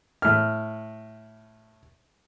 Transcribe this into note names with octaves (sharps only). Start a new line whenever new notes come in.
A2 F6